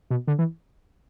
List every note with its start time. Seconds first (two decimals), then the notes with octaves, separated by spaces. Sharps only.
0.10 B2
0.28 D3
0.39 E3